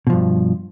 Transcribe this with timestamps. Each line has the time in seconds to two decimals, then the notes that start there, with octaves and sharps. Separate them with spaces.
0.07 B2
0.10 F3
0.13 G2